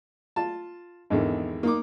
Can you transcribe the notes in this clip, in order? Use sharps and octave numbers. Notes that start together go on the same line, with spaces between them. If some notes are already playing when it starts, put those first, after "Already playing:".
F4 A5
G#1 E2 D3 D#3
A#3 D#4 D6